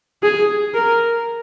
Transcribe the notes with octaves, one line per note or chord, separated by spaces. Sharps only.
G#4
A#4